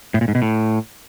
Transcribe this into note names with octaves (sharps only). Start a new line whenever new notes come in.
A2
A#2
G#2
B2
A2